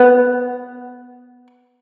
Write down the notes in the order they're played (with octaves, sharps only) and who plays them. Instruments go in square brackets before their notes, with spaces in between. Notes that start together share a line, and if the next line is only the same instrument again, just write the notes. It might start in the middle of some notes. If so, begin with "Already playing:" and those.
Already playing: [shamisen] B3